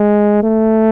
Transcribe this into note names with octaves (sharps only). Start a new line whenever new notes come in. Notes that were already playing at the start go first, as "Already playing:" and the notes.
Already playing: G#3
A3